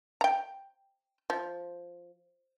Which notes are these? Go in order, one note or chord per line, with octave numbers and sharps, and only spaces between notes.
G5 A#5
F3